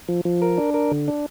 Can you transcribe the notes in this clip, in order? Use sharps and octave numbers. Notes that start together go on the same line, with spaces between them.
F3
F3
A#4
D4
A#4
D3
D4